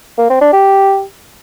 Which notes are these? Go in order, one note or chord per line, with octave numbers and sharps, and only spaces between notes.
A#3
C4
D4
G4